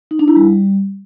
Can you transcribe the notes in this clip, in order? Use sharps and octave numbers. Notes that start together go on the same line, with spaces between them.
D#4
D4
E4
G3